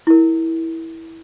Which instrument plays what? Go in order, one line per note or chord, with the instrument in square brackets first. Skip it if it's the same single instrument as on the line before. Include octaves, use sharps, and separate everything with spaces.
[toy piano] E4 A#4